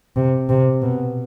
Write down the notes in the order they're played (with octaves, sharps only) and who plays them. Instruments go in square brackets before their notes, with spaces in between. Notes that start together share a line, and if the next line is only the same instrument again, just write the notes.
[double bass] C3
C3
B2